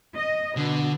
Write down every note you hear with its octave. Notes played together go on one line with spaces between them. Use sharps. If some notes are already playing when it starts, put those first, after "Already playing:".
D#5
B2 D3